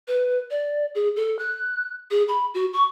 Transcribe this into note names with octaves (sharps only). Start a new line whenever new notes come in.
B4
D5
G#4
A4
F#6
G#4
B5
F#4
C#6